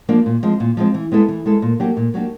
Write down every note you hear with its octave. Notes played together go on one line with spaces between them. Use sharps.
F3 A#3 D4
A#2
F3 G#3 C4
A#2
F3 G#3 C4
E3
G#3 B3 E4 A4
E3
G#3 B3 E4 A4
A#2
F#3 A#3 D4 G4
A#2
F#3 A#3 D4 G4